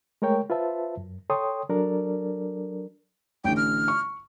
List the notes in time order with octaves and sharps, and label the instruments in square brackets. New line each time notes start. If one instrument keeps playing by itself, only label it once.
[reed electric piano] G#3 A3 A#4 C#5 G5
F4 B4 C5 E5 A5
F#2
A4 C#5 G5 C6 D#6
F#3 D4 A4 A#4 D5
[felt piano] A1 D3 [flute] G5
[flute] F6
[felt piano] C#6